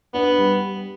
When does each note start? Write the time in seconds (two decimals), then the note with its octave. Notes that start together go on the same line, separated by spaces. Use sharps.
0.14 B3 D4
0.38 G3